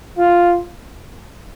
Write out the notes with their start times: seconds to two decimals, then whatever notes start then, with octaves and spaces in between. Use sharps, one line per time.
0.17 F4